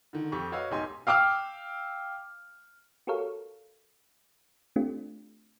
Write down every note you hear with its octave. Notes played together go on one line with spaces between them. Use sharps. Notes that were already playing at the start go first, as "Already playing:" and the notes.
D3 D#3
F2 G4 C#6
F#4 B4 C#5 D#5 F5 E6
E1 A1 D#4 G4 G#5 C6
F5 G5 D6 E6 F6
F#4 G4 A4 A#4 C#5 F5
A3 C4 D4 F4 G4